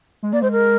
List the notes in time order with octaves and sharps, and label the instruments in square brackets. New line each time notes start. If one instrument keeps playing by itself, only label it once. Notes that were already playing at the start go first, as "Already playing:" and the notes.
[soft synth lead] G#3
[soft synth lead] A#3 [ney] D5
[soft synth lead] G#3 [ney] C5
[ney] A#4